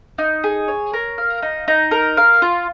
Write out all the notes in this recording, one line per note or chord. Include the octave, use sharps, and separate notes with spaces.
D#4
G#4
C#5
A#4
F5
D#4
D#4
A#4
F5
F4